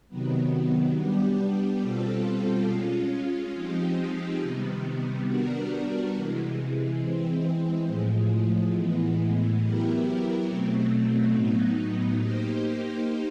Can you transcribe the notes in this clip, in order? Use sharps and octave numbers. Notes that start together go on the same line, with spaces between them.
C3 D#3 F#3 B3
G3 B3 D4 G4
B2 G3 C4 F4 A4
G#3 C#4 F4
F3 G#3 C4 D#4 G4
C3 D#3 G3 B3
G3 B3 D4 F#4 A#4
C3 E3 G#3
E3 G#3 C4
A2 F3 G#3
A2 E3 G#3 B3
F#3 B3 E4 G4 A#4
B2 F#3 A3 C4
A2 F#3 B3 D#4
A#3 D#4 G4 C5